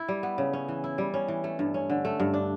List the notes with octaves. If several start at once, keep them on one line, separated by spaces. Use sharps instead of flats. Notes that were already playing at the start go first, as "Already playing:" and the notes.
Already playing: E4
G3
B3
C#3
C#4
E3
E4
G3
C#4
E3
A3
G2
C#4
D3
A3
G2
D4